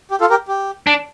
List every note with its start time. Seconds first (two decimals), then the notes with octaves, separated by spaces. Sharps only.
0.11 G4
0.21 F4 A4
0.30 G4 A#4
0.48 G4
0.87 D4